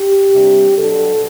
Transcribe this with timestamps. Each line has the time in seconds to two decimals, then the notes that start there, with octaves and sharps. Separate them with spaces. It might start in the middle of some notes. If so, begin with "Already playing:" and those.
Already playing: G4
0.32 C3 G3 D4
0.75 B2 F#3 B3 D4 A4